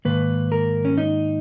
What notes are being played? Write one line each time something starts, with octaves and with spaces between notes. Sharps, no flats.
G#2 D#3 A#3 B4
A#4
C#4
D#4